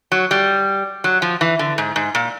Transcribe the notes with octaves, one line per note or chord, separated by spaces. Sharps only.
F#3
G3
F#3
F3
E3
D3
G#2
G#2
A#2